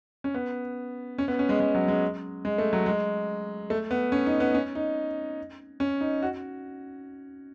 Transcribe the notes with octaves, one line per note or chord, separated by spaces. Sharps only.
C#4
B3
C#4
B3
C#4
G#3
G#3
F#3
G#3
G#3
A3
F#3
G#3
A3
B3
C#4
D#4
B3
C#4
D#4
C#4
D#4
F#4